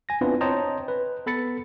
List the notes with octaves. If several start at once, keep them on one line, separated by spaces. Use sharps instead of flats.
G#5 A#6
B3 C4 D4 E4 F4 B4
C5 C#5 D#5 G5 A5 A#5
B4
B3 A4 B5 A6 C#7